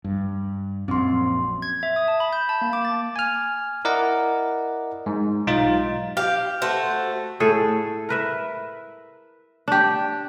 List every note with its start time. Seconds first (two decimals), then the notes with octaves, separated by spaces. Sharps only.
0.04 G2
0.88 A#1 F#2 C4 C6
1.62 G#6
1.83 E5
1.96 D#6
2.08 A5
2.20 B5
2.33 G6
2.49 A5
2.61 A#3
2.73 D6
2.85 A6
3.16 G#5 F6
3.85 E4 A#4 D5 D#5 F#5
5.06 G#2
5.47 B1 D#4 F4 A6
6.17 G4 F5
6.62 A3 F#4 C5
7.40 A2 G#4 A4
8.09 A#4 B4 E5
9.68 D4 G4